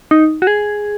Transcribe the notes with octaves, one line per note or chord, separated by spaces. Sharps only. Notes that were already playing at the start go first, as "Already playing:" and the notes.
D#4
F#4
G#4